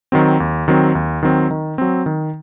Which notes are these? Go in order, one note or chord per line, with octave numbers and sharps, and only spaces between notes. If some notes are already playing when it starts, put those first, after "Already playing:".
D#3 F#3 C4
D#2
D#3 F#3 C4
D#2
D#3 F#3 C4
D#3
F#3 C4
D#3